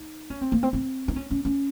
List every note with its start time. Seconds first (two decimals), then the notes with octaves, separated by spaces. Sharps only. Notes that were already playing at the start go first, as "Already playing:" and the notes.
Already playing: D#4
0.30 C#4
0.41 C4
0.52 A#3
0.63 C4
0.73 C4
1.08 D#4
1.16 C#4
1.31 C#4
1.45 C#4